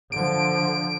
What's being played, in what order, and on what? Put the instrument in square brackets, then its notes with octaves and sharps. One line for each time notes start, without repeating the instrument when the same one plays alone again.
[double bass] D3 F3 [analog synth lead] D7